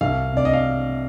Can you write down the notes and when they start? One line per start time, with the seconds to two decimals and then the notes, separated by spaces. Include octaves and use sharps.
0.01 C2 F5
0.32 C3 D5
0.45 D#5
0.53 F5